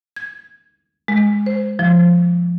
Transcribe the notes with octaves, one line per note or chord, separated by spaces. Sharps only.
G#6
G#3
C5
F3